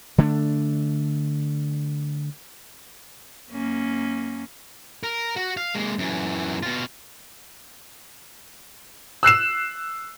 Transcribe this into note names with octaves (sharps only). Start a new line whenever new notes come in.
D3 A3 D4
F#2 A#3 C#4
A#4
F#4
F5
G#3 A#3
F#2 E3
B2 F4
E6 F#6 C7 E7